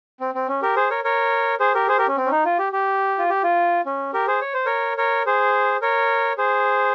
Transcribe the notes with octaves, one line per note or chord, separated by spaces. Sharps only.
C4
C4
C#4
G4 A#4
G#4 C5
A#4 C#5
A#4 C#5
G#4 C5
G4 A#4
G#4 C5
G4 A#4
C#4
C4
C#4
D#4
F4
G4
G4
F4
G4
F4
C#4
G4 A#4
G#4 C5
C#5
C5
A#4 C#5
A#4 C#5
G#4 C5
A#4 C#5
G#4 C5